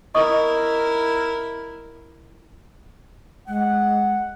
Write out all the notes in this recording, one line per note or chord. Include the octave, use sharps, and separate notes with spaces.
E4 A#4 D#5 C#6 D#6
G#3 F#5